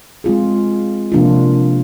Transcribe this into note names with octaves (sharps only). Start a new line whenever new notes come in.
G#3 C4 F4 G#4
C3 F3 A#3 D4 F4